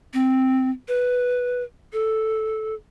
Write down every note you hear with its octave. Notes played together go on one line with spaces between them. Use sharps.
C4
B4
A4